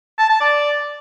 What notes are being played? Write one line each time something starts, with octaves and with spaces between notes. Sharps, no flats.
A5
A5
D5